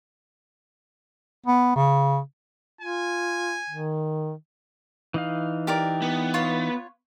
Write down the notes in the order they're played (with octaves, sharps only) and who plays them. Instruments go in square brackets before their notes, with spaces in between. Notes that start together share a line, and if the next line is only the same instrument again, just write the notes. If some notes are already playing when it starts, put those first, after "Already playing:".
[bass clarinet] B3
C#3
[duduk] F4 [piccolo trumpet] G#5
[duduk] D#3
[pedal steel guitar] E3 D#4 F5
[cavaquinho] G4 A#4 D5
[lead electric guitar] B3
[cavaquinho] F4 C#5